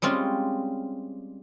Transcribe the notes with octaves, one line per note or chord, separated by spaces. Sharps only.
G3 G#3 C4 C#4 F4